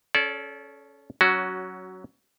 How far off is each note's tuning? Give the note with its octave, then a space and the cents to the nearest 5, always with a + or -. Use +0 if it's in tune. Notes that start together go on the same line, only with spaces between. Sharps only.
C#4 +0 A4 -25 D5 -25
F#3 +15 C#4 +0 F#4 +0